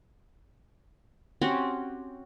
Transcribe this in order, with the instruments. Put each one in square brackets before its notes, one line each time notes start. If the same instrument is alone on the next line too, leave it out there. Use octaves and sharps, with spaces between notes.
[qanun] C4 C#4 F#4 G4